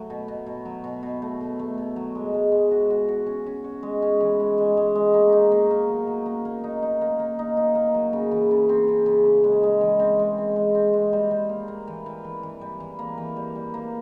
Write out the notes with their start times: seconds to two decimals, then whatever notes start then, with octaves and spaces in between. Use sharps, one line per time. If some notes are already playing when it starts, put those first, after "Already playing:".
Already playing: F#3 A3
0.10 B2
0.28 B2
0.46 B2
0.65 F#3
0.84 B2
1.03 B2
1.22 A3
1.41 B2
1.59 A3
1.78 B2
1.96 F#3
2.15 G#3
2.34 G#3
2.52 G#3
2.71 F#4
2.90 F#4
3.08 F#4
3.26 C#4
3.46 C#4
3.64 F#4
3.83 G#3
4.02 C#4
4.21 E3
4.40 G#3
4.58 G#3
4.77 G#3
4.95 G#3
5.14 A#3
5.32 D#4
5.52 A#3
5.71 A#3
5.89 F#3
6.07 F#3
6.26 A#3
6.45 A#3
6.64 D#4
6.82 D#4
7.01 A#3
7.19 A#3
7.39 D#4
7.57 D#4
7.75 A#3
7.94 F#3
8.13 C#3
8.31 E3
8.51 C#3
8.69 C4
8.88 C#3
9.06 C#3
9.26 C#3
9.44 G#3
9.63 G#3
9.81 E3
10.00 C4
10.19 G#3
10.38 C4
10.56 G#3
10.75 C4
10.94 G#3
11.13 G3
11.31 G3
11.49 A#3
11.68 A#3
11.88 E3
12.06 E3
12.24 E3
12.43 E3
12.61 G3
12.80 E3
12.99 A#3
13.18 E3
13.36 G3
13.55 G3
13.74 A#3